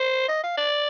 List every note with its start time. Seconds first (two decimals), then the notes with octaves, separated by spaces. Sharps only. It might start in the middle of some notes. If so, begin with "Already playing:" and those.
Already playing: C5
0.29 D#5
0.43 F5
0.57 D5